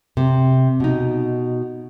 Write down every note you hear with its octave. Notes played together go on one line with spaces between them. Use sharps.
C3
B2 D#4